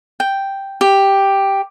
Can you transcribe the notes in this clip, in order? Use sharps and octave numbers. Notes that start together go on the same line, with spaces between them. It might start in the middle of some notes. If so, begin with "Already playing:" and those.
G5
G4